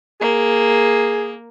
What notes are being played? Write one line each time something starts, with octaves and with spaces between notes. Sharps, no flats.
A#3 G#4